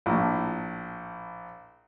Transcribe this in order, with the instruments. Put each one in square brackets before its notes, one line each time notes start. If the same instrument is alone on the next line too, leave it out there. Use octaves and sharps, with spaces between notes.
[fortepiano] A#1 A2